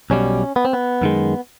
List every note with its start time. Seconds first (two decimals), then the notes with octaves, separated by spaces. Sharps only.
0.10 B1 B2 G3 C#4
0.56 B3
0.65 C4
0.73 B3
1.01 F#2 D#3 G#3